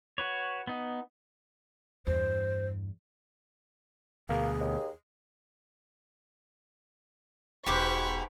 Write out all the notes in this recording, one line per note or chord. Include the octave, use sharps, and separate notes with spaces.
F#4 B4 C#5
B3 D#4
E2 G2 C5
D2 B2 A#3 G#4
D#2
E1 G#2 B2 G4 C5 B5 C#6 D6